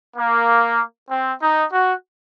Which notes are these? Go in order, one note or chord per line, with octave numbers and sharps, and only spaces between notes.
A#3
C4
D#4
F#4